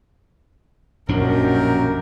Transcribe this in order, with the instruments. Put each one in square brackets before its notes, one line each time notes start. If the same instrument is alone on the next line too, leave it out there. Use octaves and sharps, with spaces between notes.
[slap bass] A#1 F3 D4 [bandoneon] F#2 [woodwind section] B2 [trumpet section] F#4 G4 A#4